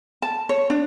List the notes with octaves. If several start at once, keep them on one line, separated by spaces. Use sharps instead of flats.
A5
C#5
D4